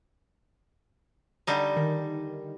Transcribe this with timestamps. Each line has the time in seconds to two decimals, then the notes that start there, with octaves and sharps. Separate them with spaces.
1.47 D3 G3 D#4 G6
1.77 D#3